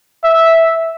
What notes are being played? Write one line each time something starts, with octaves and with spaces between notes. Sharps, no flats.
E5